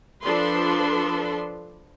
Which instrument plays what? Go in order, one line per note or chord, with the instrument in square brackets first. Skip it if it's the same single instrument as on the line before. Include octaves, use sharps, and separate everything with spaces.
[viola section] F3 D4 A4 B4 C6